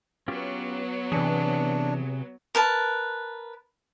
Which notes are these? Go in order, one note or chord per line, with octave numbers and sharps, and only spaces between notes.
F#3 B3 C#4 F4 G4
C3 E3 D4 G#4
A#4 B4 A5